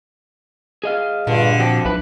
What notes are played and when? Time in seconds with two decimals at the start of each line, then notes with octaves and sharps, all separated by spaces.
0.84 G#4 D#5 F5
1.27 G2 A#2 D3
1.59 F2 F3 F#4 G4
1.85 B1 E4 B4